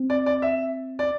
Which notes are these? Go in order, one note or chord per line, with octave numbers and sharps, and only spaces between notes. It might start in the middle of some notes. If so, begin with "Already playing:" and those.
Already playing: C4
D5
D5
E5
D5